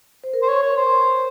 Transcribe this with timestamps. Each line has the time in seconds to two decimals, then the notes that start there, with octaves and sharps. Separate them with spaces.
0.24 C5
0.33 A#4
0.42 C5
0.48 C#5
0.62 C#5
0.77 C5